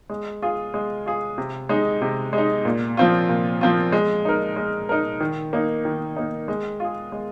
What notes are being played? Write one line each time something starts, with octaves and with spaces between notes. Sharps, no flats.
G#3
F4 G#4
G#3
F4 G#4
C3
G#3 D#4
C3
G#3 D#4
A#2
F3 C4 F4
A#2
F3 C4 F4
G#3
D#4 A#4
G#3
D#4 A#4
D#3
A#3 D#4
D#3
A#3 D#4
G#3
F4 G#4
G#3